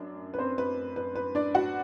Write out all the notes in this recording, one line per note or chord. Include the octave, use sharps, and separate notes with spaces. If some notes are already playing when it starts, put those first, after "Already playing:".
Already playing: F#2 D4
B4
C4 C5
B4
B4
B4
D4 D5
F#4 F#5